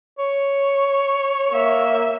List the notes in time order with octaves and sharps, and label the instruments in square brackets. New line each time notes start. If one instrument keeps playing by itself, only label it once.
[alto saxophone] C#5
[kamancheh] A#3 E5